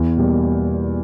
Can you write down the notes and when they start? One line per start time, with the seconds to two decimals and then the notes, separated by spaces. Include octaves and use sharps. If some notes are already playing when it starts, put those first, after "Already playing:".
Already playing: E2
0.16 B2 G3 A#3